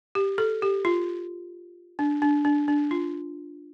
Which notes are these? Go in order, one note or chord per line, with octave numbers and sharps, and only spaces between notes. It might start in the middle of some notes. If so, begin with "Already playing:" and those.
G4
A4
G4
F4
D4
D4
D4
D4
F4